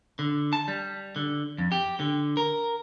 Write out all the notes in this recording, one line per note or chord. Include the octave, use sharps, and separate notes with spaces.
D3
A5
G3
D3
F2
G4
D3
A#4